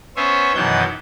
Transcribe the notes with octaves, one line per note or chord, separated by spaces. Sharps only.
B3 C#4 C5 C#5 E5 G#5
F#2 B2 D#3 E3 F#5 G6